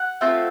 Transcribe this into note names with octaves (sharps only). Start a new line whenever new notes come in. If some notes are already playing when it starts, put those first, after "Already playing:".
Already playing: F#5
A3 C4 F4 A4